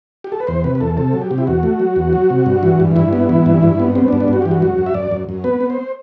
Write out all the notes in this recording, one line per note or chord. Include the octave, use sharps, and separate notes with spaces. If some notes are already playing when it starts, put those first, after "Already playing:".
G4
A4
B4
E2 C5
C3 B4
B4
E2 A4
C3 A4
F#3
G4
C3
E4
E2 F#4
A3
F#3
E2
F#3
C3
G2
E3
G2
G2 E4
B3
E3
G2
G2
B3
B3 C4
D4
G2
D4
G2 F#4
E3 G4
F#4
F#2
F#2
E5
F#2 D5
F#2
F#2
B3 B4
B3
C5